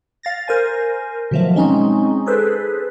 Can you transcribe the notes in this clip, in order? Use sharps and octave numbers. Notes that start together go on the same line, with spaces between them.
F5 A6 A#6
A#4 C5 G#5
B2 D#3 F3 F#3 A3
G#3 C4 C#4 D#4
G#4 A4 B4 C5